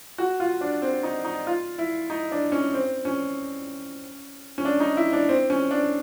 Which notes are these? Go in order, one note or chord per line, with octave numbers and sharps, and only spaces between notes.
F#4
F4
D4
C4
D#4
D#4
F4
E4
D#4
D4
C#4
C4
C#4
C#4
D4
D#4
E4
D4
C4
C#4
D4